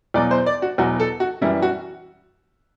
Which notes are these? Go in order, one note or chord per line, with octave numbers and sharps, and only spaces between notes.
E2 B2 F#3 D5
C5
D5
F#4
E2 B2 F#3 F#4
A4
F#4
F#2 E3 G3 E4
F#4